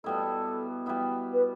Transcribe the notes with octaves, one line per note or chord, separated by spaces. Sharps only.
B2 G3 B3 E4 A4
B2 G3 B3 E4
B4